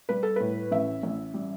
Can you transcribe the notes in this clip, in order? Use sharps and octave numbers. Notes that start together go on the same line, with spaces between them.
G3 B4
A4
A2 B4
A1 E5
A1
G3